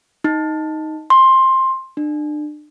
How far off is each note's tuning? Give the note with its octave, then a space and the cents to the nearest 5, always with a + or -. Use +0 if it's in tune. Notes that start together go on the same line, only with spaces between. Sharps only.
D#4 +5
C6 +15
D4 +35